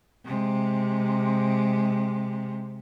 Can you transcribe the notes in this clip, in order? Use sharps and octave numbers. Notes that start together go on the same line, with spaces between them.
C3 G#3